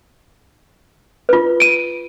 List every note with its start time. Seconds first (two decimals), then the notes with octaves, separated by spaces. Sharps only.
1.29 F4 B4
1.60 D7 D#7